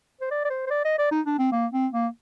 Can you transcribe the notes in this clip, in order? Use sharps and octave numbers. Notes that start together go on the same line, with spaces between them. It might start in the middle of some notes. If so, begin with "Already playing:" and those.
C5
D5
D5
C5
C5
D5
D#5
D5
D#4
D4
C4
A#3
C4
A#3